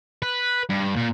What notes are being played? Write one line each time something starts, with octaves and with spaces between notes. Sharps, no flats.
B4
G2
A#2